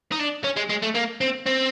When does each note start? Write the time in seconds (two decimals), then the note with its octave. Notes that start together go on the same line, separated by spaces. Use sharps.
0.12 D#4
0.19 D4
0.44 C#4
0.57 G#3
0.70 G#3
0.83 A3
0.95 A#3
1.21 C4
1.46 C4